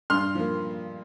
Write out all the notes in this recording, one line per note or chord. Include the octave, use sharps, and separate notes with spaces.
G2 C6 F6
F3 A#3